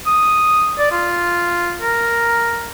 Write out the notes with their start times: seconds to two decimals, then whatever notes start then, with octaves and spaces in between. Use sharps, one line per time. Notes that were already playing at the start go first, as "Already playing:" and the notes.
0.07 D#6
0.79 D5
0.92 F4
1.82 A#4